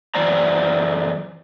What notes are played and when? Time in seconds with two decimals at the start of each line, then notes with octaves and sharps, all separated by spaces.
0.15 F#2 E3 C5 D5 A#5